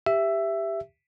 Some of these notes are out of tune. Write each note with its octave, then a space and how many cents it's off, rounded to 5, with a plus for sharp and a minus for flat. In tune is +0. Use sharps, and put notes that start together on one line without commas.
G4 +15 E5 +10